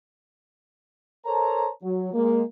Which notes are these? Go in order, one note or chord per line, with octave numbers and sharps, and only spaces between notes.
A4 A#4 C5 C#5 A5 A#5
F#3
G#3 A#3